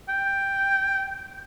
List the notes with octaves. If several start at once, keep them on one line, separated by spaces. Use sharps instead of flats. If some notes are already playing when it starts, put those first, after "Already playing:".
G5